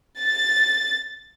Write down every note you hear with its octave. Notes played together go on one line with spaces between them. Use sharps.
A6